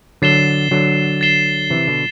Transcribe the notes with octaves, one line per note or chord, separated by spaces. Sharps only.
D3 F#3 A6 C7 E7 G7
D3 F#3
A6 C7 E7 G7
C3 E3
B2 D3